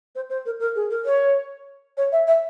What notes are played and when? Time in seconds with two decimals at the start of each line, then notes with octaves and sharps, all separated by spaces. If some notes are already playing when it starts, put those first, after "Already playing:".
0.15 C5
0.30 C5
0.45 A#4
0.60 A#4
0.75 G#4
0.90 A#4
1.05 C#5
1.97 C#5
2.12 E5
2.27 E5